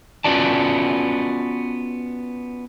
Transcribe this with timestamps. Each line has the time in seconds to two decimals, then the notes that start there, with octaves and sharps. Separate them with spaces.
0.25 B3 C#4 F4 F#4 D5 A5